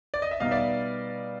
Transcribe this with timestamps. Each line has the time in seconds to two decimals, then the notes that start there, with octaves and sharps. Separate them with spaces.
0.14 D5
0.22 D#5
0.31 E5
0.40 B2 G3 B3 D#4 D#5 F5
0.51 D5 E5